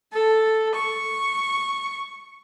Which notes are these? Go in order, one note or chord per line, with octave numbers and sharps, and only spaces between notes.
A4
C#6